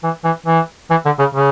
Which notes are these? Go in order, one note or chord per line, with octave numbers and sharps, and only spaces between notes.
E3
E3
E3
E3
D3
C#3
C#3